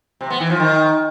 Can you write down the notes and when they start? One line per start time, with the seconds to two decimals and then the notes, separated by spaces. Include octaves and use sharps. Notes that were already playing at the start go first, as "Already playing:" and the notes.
0.21 C3
0.30 B3
0.40 E3
0.50 F3
0.60 D#3